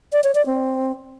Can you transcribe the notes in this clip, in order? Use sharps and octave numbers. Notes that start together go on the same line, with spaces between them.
D5
C#5
D5
C4